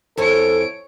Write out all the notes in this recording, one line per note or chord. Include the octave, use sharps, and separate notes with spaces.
F2 E4 A4 C#5 G#5 D7